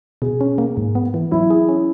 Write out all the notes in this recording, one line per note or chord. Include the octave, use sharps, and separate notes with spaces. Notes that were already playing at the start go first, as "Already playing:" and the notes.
B2 G#4
C#4
A#3
G#2
B3
E3
F#3 E4
G#4
C#4